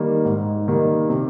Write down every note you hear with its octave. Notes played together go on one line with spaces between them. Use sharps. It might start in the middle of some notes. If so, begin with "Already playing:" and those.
Already playing: D#3 G3 A#3
G#2
D#3 G3 A#3
C3